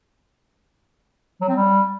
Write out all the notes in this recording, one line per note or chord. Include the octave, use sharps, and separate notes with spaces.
F#3
C4
G3